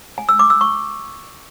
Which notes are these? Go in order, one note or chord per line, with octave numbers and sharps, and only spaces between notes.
G#5
E6
D6
E6
C#6